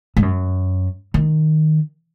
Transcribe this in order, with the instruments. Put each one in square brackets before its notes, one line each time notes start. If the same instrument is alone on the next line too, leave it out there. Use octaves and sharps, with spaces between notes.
[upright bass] G#2
F#2
D#3